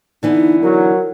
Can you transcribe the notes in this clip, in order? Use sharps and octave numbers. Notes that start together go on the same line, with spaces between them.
D3 E3 B3 D#4
F#3 A#4